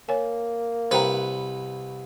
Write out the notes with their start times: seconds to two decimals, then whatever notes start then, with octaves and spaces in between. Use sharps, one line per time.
0.09 A#3 C#5 G#5
0.91 C2 B4 C5 F#5 G5 A#5